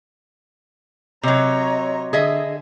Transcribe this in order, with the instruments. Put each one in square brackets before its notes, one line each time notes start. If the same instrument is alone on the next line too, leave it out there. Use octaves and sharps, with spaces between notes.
[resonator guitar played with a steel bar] C3 F#3 [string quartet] C#5 D#5 A#5
[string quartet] D3 [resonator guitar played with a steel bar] G#4 D#5 E5